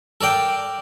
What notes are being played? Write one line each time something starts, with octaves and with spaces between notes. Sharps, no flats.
A4 A#4 D5 G5